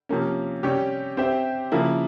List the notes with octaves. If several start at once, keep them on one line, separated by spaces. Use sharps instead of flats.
C3 F3 A#3 C#4
C3 G3 C#4 G4 C#5
C4 G4 C5 E5
C#3 F3 A#3 E4